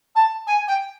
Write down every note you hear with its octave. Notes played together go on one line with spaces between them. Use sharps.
A5
G#5
G5